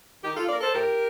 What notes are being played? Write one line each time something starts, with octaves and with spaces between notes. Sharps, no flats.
D#3 D#4 G4
F4 A4
A#3 A#4 D5
A4 C5
A2 G4 A#4